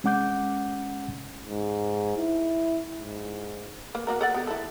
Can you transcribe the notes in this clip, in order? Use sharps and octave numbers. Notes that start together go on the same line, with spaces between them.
G#3 C#4 F#5 D6 G6
G#2
E4
G#2
A#3 B4
A#3 F#4 A#4
A4 D5 F#5
B3 G4
E4 A4